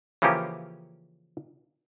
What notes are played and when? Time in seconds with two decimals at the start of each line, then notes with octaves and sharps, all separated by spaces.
0.22 C#3 E3 F3 A#3 C#4 G4